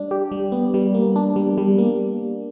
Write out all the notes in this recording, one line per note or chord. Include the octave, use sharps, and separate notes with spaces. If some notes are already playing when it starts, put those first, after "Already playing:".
Already playing: G3 D4
G4
G3
B3
G3
A#3
D4
G3
G3
A#3